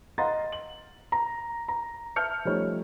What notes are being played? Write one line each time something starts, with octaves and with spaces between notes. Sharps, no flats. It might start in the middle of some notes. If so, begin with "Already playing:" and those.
D#5 F5 F#5 A#5 C6 A6
F#7
A#5
A#5
E5 A5 F6 G6 C#7
F3 G3 A3 C#4 D#4 C#5